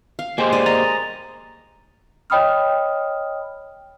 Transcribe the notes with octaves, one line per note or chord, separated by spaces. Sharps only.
F5
G#3 A#3 G4 C5
D5 D#7
D#5 A#5 A6 F7
C#5 D#5 G5 B5 D#6 F6